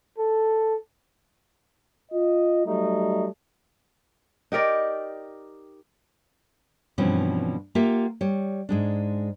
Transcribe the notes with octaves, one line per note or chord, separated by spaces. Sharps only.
A4
F4 D#5
F#3 G3 A3 D#4
D#4 G4 A#4 D5
G2 B2 E3 F3 C4 C#4
A#3 F4 G4 E5 F#5
G3 C#5
G#2 G#3 D4